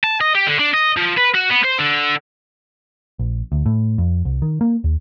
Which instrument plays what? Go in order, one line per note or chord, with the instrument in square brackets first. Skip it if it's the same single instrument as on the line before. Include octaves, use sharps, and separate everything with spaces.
[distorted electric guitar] A5
D#5
G4
D3
D4
D#5
F3
B4
F#4
B3
C5
D3
[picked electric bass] A#1
D2
A2
F2
C2
D#3
A#3
D#2